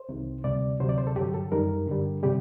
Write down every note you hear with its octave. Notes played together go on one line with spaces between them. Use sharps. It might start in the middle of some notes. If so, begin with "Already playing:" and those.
Already playing: C5
C2 C3 D#3
D2 C3 G3 D5
D2 C3 F#3 C5
D5
C5
A4
G2 D3 F#3 G4
A4
F#2 D#3 G3 A#4
G2 D3 G3
C3 G3 G4